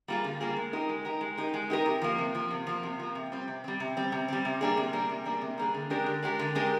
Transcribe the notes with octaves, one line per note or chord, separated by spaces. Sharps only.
G3 A#3 F4 G#4
D3
G3 A#3 F4 G#4
G#3
D#4 G4 A#4
G#3
D#4 G4 A#4
G#3
D#4 G4 A#4
G#3
D#4 G4 A#4
C3
F3 A#3
C3
F3 A#3
C3
F3 A#3
C3
F3 A#3
C3
G3 C4
C3
G3 C4
C3
G3 C4
C3
G3 C4
C3
G3 A#3 D4 G#4
C3
G3 A#3 D4 G#4
C3
G3 A#3 D4 G#4
C3
G3 A#3 D4 G#4
D3
G#3 D4 G4 A#4
D3
G#3 D4 G4 A#4
D3
G#3 D4 G4 A#4